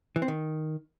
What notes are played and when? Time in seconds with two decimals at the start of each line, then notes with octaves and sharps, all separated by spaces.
0.16 E3
0.22 C4
0.28 D#3